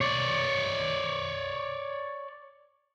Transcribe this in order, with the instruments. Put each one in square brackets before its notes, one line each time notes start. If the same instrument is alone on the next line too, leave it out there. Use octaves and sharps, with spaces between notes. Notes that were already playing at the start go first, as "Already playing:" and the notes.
[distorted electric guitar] C#5 D5